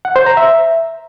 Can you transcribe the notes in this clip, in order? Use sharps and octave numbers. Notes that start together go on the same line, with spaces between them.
F#5
C5
A#5
E5